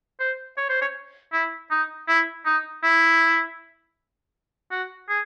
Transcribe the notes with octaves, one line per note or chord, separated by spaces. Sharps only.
C5
C#5
C5
C#5
E4
D#4
E4
D#4
E4
F#4
G#4